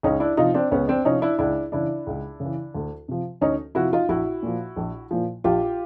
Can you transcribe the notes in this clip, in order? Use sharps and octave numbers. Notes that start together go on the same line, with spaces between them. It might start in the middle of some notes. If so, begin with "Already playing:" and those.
C#2 C#4 D#4
D4 E4
C3 F3 D#4 F4
C4 D4
C#2 B3 C#4
C4 D4
C3 F3 C#4 D#4
D4 E4
C#2 D4 E4
C#3 E3 D4 E4
C#2
C#3
E3
D2
C3 F3
D2 C#4 D#4
C3 F3 E4 F#4
D#4 F4
A#1 E4 F#4
A#2 F3
A#1
A#2 F3
A#1 F4 G4